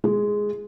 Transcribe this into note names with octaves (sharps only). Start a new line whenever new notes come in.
G#3